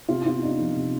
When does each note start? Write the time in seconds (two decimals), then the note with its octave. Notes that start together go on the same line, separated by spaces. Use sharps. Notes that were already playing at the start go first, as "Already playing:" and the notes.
0.09 C3 F4
0.25 B3 F4
0.42 D4 D#4
0.59 F3
0.76 C3